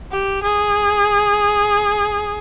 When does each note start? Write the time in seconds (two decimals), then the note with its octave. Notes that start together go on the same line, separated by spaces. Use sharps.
0.12 G4
0.43 G#4